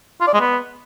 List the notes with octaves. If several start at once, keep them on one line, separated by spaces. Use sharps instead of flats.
F4
D5
G#3
B3